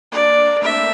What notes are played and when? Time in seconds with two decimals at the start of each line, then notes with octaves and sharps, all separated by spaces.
0.12 A#3 D4 D5
0.45 A#3 D4
0.62 A3 C4 E5